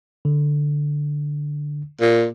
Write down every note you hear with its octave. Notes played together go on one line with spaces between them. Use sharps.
D3
A#2